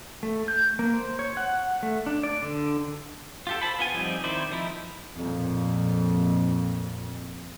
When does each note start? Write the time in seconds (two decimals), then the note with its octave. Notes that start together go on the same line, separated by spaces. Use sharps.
0.23 A3
0.48 G6
0.79 A#3
0.94 C5
1.19 C#5
1.37 F#5
1.83 A3
2.06 D4
2.23 D5
2.42 D3
3.47 F4 G4 A4
3.61 C5 A5 B5
3.79 B3 F4 G#5
3.94 F3 G3 C4 D#4
4.24 D#3 C4 E4 C5 D5
4.52 F3 D#4 E4
5.16 F2 A#2